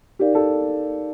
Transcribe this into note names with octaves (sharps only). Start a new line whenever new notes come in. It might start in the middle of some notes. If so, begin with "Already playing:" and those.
D#4 G4 A#4 D5 F5
A4